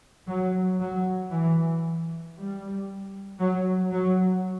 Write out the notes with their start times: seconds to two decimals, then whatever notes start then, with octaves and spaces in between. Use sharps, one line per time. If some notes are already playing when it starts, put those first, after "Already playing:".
0.28 F#3
0.81 F#3
1.33 E3
2.36 G3
3.40 F#3
3.92 F#3